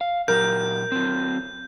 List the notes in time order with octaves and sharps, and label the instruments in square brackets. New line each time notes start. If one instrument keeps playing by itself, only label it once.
[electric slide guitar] F5
[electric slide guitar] A#2 F#3 G4 [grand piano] A#4 [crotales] G6
[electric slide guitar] F#3 C4